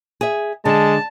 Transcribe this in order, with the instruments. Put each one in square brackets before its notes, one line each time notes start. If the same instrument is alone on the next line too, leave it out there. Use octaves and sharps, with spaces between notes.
[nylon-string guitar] G#4 E5
[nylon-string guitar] D3 [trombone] G#3 [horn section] A5